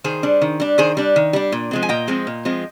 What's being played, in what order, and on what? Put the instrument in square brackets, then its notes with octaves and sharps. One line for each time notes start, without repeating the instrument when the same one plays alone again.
[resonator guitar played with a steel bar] D#3 G#4 C5
G3 D4
D#3
G3 D4
D#3 G#4 C5
G3 D4
D#3
G3 D4
A#2
F3 G#3 C4
G#5
A#2 D#5 G5
F3 G#3 C4
A#2
F3 G#3 C4